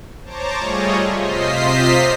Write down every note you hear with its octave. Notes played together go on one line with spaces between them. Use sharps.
C5 C#5 A5 A#5 D6
G3 A3 F4 G#4 C#5 D#5
C3 F4 C5 D#5 B6 C7